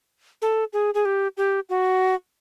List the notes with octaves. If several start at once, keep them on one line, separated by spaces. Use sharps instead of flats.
A4
G#4
G#4
G4
G4
F#4